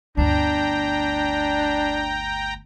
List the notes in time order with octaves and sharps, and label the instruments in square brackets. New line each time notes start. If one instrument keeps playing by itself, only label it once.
[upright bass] G1 D2 [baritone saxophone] D4 [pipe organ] G5 A#5